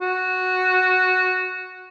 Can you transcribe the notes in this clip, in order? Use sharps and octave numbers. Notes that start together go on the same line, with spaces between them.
F#4